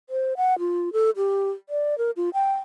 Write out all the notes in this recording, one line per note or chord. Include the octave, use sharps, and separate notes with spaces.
C5
F#5
F4
A4
G4
D5
A#4
F4
G5